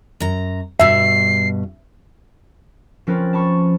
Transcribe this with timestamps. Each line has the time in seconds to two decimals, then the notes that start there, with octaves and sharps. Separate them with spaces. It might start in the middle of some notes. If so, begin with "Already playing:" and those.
0.20 F#2 A#5
0.80 G2 B2 E5 C7
3.07 F3 C4 C#4 A#4 B4 A6
3.33 A5 B5 C#6